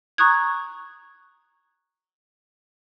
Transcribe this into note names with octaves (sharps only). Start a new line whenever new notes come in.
A#5 C#6 D#6 F#6 G#6